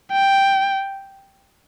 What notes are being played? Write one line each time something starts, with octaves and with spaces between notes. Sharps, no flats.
G5